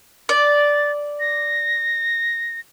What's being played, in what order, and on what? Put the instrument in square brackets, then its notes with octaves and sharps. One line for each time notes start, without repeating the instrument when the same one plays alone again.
[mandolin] D5 [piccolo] A6
[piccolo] A#6